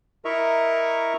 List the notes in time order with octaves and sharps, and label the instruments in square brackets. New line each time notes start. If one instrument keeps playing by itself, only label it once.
[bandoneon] E4 A#4 D#5 E5 A#5 C#6